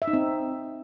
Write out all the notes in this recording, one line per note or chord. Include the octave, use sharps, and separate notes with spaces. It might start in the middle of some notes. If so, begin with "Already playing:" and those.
E5
D#4
C4